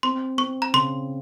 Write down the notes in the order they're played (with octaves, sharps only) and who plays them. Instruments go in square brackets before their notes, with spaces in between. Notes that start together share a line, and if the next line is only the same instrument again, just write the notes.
[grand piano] C4 [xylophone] C6
[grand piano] C4 [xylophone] C#6
[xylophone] A#5
[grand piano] C#3 [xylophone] C6